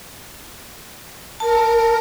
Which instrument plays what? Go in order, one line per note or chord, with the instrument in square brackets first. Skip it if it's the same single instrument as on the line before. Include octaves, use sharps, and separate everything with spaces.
[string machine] A#4 [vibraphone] A5